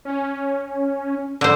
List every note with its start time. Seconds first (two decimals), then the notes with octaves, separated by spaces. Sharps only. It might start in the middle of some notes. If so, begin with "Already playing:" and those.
0.05 C#4
1.41 D3 C5